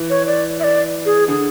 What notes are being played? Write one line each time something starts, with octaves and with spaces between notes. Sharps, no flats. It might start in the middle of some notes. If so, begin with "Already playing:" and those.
Already playing: E3
C#5
D5
E5
D5
G#4
D3 G#4